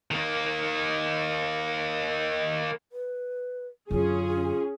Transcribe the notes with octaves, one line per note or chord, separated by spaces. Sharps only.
D#3 A#3
B4
F#2 D3 C#4 F4 G#4